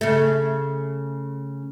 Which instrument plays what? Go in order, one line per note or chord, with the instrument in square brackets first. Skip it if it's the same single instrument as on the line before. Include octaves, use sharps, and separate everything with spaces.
[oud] C#3 A3